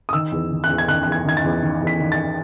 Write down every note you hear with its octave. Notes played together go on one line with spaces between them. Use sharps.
D#6
D#3 E6
E2
D#3
F#6
E2
G#6
D#3 F#6
E2 F#6
G#6
D#3 G#6
A6
E2
D#3
E2
B6
D#3
A6